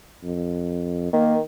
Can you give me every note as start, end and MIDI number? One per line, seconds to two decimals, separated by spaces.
0.23 1.11 41
1.13 1.41 51
1.13 1.34 58